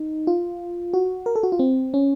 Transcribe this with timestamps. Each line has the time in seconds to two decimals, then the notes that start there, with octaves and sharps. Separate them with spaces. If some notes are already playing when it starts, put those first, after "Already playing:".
Already playing: D#4
0.27 F4
0.94 F#4
1.26 A#4
1.36 A4
1.43 F#4
1.52 F4
1.59 C4
1.94 C#4